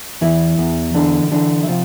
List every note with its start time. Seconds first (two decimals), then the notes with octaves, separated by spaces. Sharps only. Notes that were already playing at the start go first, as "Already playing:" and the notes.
0.21 E2 E3 E4
0.58 E2
0.94 D3 E3 D4
1.31 D3 E3 D4
1.63 E4
1.68 C3 F3 F4